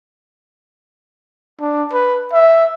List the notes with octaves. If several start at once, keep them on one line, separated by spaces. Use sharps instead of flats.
D4
B4
E5